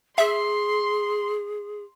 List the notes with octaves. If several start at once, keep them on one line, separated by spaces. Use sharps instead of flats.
G#4 E5 C6